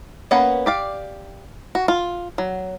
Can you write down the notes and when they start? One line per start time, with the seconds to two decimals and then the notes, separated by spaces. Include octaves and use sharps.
0.31 A#3 B3 C#4 B4 F#5
0.66 G4 D5 F5
1.75 F#4
1.88 F4
2.38 F#3